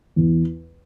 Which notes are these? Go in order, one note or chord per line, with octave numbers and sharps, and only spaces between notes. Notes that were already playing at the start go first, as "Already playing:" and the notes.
E2